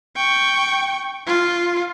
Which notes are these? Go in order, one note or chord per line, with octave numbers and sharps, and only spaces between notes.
G5 C#6
F4